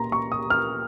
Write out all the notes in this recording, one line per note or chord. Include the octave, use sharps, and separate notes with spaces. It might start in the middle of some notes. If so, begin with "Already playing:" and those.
Already playing: A#2 A#5 C6
C#6
D#6
F6